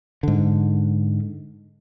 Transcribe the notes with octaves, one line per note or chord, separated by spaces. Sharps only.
G#2 D3